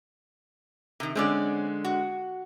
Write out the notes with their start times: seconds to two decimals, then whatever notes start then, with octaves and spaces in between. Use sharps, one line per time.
1.00 C3 D#3
1.15 D3 G#3 C4 C#4 D5
1.84 F#4